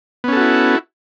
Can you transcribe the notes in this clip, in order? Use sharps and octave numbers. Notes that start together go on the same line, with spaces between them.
B3 C#4 E4 F#4 A4